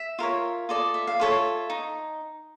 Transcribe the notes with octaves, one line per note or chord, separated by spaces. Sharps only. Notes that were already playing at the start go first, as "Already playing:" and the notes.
Already playing: E5
F4 A#4 C#5
F4 A4 D5 D#5
E5
F5
F4 A4 C#5 E5
D#4